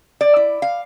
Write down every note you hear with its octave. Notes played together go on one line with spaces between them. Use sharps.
D5
E4
F5